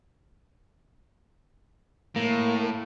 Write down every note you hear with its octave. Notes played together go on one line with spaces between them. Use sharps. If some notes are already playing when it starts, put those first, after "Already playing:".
A2 A#3